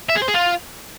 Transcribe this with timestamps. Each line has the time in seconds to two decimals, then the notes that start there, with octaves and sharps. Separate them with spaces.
0.09 E5
0.16 G#4
0.22 C5
0.28 G#4
0.34 F4